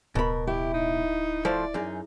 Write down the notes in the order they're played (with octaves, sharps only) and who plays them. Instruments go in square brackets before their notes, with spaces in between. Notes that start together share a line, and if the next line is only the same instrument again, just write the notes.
[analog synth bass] D1 [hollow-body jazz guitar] B2 B5 [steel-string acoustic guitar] A#4
[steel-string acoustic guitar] E4 [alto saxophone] G4
[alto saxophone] D#4
[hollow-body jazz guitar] F3 A3 C5 [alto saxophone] D5
[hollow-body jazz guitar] F#2 D#4 [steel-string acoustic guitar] G#4